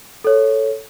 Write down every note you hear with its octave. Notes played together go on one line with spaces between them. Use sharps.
A4 C#5